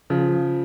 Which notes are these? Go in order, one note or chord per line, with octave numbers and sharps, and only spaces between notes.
C#3 F3